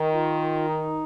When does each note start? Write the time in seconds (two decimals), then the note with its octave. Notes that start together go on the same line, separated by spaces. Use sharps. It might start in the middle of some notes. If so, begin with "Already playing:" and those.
Already playing: D#3
0.13 F4
0.69 D#4